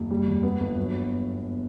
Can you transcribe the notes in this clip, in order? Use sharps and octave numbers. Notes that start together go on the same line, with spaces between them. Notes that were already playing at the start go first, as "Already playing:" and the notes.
Already playing: F#1
G3
E1
B3
G1
F#3